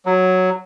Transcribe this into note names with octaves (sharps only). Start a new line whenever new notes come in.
F#3